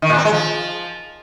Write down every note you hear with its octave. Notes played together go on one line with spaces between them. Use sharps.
D#3
A#2
C4
G#3
F3